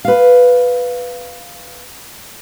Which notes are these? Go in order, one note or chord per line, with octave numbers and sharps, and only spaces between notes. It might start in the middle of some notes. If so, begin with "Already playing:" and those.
B4 F5